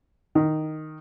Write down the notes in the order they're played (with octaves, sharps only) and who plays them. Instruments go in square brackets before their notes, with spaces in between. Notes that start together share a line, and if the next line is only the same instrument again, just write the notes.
[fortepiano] D#3